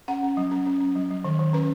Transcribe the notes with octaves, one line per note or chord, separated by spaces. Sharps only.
C#4 F#5
C#4
F#3
C#4
C#4
C#4
F#3
F#3
D#3
D#3
C#4 B4